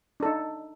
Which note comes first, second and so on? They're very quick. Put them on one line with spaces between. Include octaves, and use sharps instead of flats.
D4 A4 D#4